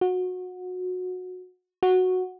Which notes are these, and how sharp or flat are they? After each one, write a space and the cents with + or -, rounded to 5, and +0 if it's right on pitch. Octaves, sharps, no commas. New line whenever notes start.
F#4 -20
F#4 -5